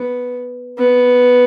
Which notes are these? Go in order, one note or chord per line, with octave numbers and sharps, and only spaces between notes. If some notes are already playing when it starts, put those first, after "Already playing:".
Already playing: B3
B3